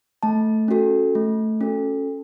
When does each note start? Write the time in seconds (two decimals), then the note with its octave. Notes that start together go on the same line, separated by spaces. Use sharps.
0.23 A3 A5
0.68 C#4 F#4 A4
1.15 A3
1.61 C#4 F#4 A4